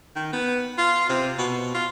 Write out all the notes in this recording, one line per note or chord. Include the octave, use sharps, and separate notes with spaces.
D#3
B3
F4
C3
B2
F4